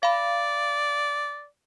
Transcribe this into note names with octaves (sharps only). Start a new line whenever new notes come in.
D5 F5 B5